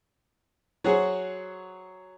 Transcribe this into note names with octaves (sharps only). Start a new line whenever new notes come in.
F#3 F#4 G#4 C5